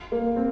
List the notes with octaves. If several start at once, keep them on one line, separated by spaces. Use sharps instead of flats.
A#3
C4